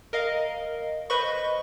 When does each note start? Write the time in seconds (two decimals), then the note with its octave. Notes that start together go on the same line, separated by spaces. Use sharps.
0.13 A#4 D#5 F5
1.10 B4 C5 D#5 B5 C#6